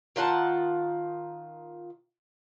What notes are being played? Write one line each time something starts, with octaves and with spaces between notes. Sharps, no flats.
D#3 F4 F#5 A5